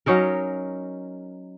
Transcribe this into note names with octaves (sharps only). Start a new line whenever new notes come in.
F#3 C#4 D#4 A#4